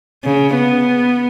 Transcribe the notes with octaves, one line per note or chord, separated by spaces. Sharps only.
C#3
B3